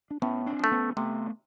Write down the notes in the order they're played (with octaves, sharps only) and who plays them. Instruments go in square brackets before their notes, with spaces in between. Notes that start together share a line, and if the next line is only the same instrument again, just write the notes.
[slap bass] D4
[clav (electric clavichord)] A2 [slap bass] B3 C#4
[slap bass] C4 D4
[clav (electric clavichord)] F3 A3
[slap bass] B3 C#4
[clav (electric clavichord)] C3 [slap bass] A3 B3